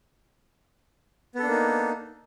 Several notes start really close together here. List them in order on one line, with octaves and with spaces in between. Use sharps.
B3 A4 D4 A#3 D#4